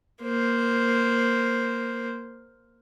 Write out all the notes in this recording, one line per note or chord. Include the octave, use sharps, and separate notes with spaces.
A#3 C5